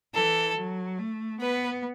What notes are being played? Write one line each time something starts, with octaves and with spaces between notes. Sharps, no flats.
E3 A4
F#3
A3
B3 B4